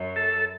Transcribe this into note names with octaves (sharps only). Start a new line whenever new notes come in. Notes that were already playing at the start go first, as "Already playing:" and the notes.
Already playing: F#2
A4